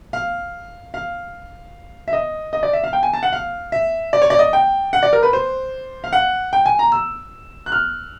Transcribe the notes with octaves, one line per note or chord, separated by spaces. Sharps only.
F5
F5
E5
D#5
D#5
D5
E5
F5
G5
G#5
A5
F#5
F5
E5
D5
C#5
D5
D#5
G5
F#5
D5
A#4
B4
C5
F5
F#5
G5
G#5
A#5
E6
F#6
F6